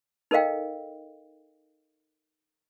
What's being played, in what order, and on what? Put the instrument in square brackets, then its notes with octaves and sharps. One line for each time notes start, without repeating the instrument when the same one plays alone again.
[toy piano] D#4 A4 A#4 D#5 F5 G5